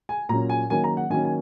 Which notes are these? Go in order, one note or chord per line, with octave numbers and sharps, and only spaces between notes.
G#5
A#2 F#3 C#4 A#5
G#5
D#3 F#3 A#3 C#4 G#5
A#5
F#5
D#3 F#3 A#3 C#4 G#5
G#5